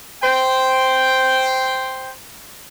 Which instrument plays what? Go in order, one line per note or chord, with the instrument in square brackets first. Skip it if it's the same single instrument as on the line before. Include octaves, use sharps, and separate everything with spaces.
[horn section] C5 G5